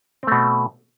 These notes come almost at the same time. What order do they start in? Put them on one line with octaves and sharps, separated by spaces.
C4 A3 B2